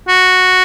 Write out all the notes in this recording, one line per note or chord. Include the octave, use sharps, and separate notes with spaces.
F#4